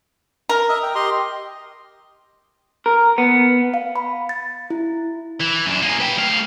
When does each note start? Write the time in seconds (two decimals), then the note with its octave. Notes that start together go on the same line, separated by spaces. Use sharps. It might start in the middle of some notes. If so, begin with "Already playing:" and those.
0.49 A#4
0.69 D#5 E5
0.83 G5
0.95 G4 D#5 C6
2.86 A#4
3.18 B3
3.74 F5
3.96 B5
4.29 A6
4.70 E4
5.40 E3
5.66 F#2 D4
5.82 A#3 G#4
6.00 B4 G5
6.18 A3 F5